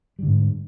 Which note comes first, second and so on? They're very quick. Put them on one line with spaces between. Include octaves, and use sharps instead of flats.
G3 D3 G#2